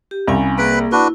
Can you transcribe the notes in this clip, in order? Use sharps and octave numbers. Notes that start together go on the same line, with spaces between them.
G4
C2 C#4 F5 G#5
A#3 G#4 B4 B5
D4 E4 F#4 B4